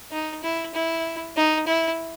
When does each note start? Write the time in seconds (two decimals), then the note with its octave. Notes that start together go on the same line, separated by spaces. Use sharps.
0.11 D#4
0.43 E4
0.74 E4
1.36 D#4
1.67 E4